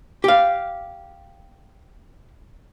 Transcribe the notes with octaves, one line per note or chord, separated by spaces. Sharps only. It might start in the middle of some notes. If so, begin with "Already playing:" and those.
G4 F5